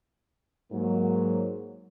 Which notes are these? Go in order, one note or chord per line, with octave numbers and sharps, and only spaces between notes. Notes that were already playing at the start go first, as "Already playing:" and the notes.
G#2 F#3 A#3